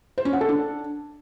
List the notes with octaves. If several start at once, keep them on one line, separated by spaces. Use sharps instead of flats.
C5
C#4
F#5
A4
D4